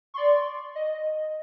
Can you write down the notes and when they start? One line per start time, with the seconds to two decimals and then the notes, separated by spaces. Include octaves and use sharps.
0.14 D5 C6 C#6
0.75 D#5